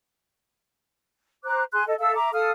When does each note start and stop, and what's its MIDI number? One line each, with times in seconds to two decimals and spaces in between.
1.44 1.63 72
1.44 1.63 82
1.44 1.63 86
1.44 1.63 90
1.72 1.84 68
1.72 1.84 80
1.72 1.84 84
1.72 1.84 90
1.87 1.94 69
1.87 1.94 75
1.99 2.15 69
1.99 2.15 76
1.99 2.15 77
1.99 2.15 88
2.15 2.29 76
2.15 2.29 82
2.15 2.29 86
2.33 2.50 69
2.33 2.50 77
2.33 2.50 87
2.33 2.50 89